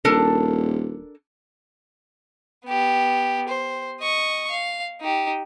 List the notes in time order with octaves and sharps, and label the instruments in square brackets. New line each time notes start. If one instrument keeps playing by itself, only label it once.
[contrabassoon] D#1 [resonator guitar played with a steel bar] D4 A4 A#4
[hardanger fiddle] B3 G4
C5
D#5 C#6
F5
D#4 G4